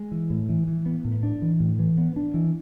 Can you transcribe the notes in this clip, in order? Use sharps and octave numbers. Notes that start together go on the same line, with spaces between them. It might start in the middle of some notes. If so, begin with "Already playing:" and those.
Already playing: G#3
E3
A2
E3
E3
B3
A2
D4
E3
A2
E3
B3
D4
E3